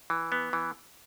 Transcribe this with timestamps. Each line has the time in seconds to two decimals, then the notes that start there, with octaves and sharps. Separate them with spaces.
0.10 E3
0.32 B3
0.53 E3